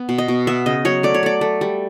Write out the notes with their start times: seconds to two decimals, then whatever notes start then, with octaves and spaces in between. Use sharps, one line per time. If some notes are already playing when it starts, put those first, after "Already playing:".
Already playing: B3
0.09 B2
0.18 D#5
0.28 B2
0.47 B3 E5
0.66 C#3 D#5
0.85 F#3 C#5
1.03 A3 D5
1.14 C#5
1.23 A3 D5
1.41 A3
1.61 G3